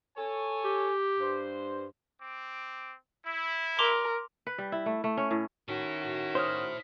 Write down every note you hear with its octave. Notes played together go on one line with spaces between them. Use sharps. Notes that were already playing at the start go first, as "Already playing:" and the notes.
A4 C#5 G#5
G4
G2 C5
C4 D6
E4
A#4 C6 D6 F7
B4
G3
E4
A3
A3
C#4
A2
D#3 C#4 E4 F#4 A4
C5 C#5 D#6 F6